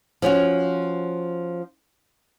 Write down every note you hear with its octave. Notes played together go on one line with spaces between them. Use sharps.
F3 C#4 F4 F#4